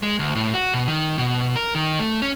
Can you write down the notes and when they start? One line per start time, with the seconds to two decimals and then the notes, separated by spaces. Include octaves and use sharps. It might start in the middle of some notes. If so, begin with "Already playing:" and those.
0.03 G#3
0.19 D2
0.35 A2
0.54 F#4
0.74 B2
0.88 D#3
1.18 B2
1.56 A#4
1.75 D#3
1.99 A3
2.22 C#4